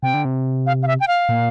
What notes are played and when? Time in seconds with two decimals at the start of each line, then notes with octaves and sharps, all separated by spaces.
0.03 C3 G5
0.14 D3
0.25 C3
0.66 F5
0.83 F5
0.87 E5
1.00 G5
1.08 F5
1.29 A#2